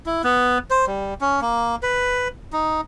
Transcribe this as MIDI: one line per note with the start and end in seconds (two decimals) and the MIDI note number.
0.06 0.22 64
0.24 0.58 59
0.71 0.85 72
0.87 1.14 55
1.21 1.40 61
1.41 1.76 58
1.83 2.28 71
2.53 2.81 63